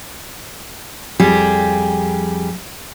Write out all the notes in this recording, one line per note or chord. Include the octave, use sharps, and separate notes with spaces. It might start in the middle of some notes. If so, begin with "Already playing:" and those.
F2 G3 G4 G#4